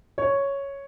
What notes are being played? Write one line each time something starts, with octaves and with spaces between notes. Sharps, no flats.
C#5